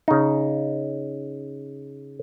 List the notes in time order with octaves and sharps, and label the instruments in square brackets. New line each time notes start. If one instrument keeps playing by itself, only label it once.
[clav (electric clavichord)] C#3 D#4